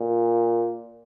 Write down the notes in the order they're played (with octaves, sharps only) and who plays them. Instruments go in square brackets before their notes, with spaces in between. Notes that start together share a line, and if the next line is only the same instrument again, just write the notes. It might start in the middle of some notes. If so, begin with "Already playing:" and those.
Already playing: [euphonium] A#2